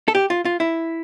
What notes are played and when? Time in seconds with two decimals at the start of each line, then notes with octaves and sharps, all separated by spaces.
0.08 A4
0.15 G4
0.30 F4
0.45 F4
0.60 E4